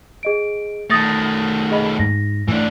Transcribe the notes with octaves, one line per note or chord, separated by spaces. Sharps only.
G#4 D#5 D7
D#3 A3 D#6 A6 A#6
G#4 D#5 B5
G#2 A#6
A2 E3 D4